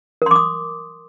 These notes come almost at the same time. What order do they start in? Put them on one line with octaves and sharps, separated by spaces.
A#4 C6 D6 D#6